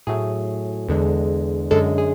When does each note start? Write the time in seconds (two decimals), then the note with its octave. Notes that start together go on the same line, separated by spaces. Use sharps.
0.07 A2 F#3 A3 G#4
0.88 E2 D3 G#3
1.71 F#2 D3 G#3 A4
1.98 G#4